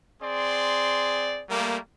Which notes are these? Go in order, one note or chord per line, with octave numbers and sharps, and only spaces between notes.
C4 G#4 D5 C6
G3 A3 A#3